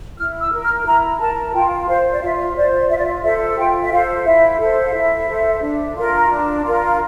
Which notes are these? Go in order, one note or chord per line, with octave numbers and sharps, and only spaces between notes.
E4 F6
E6
A#4
F6
E4 A#5
A#4 A5
F4 G5
C5 F5
D5
F4 E5
C5 D5
F4 E5
D5
E5
A4 C5 E5
F4 G5
E5
A4 C5 F5
E4 E5
A4 C5
F5
E4 E5
A4 C5
D4
F4 A#4
D4
F4 A#4